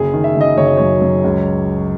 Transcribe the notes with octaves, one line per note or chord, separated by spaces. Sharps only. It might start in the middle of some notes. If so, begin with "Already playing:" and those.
Already playing: F#1 G#4
D#3
E5
F#1
D#5
F#1 C#5
D#5
F#2 C#5
F#2
C#2